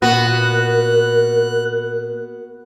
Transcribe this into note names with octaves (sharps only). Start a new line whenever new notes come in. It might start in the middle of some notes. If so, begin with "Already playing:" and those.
A#2 B3 F#4 A#4 F#6